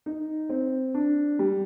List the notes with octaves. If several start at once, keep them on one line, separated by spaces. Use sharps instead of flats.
D#4
C4
D4
G3